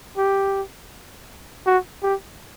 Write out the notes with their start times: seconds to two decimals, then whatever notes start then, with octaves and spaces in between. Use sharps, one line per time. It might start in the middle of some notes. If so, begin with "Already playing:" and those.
0.17 G4
1.66 F#4
2.03 G4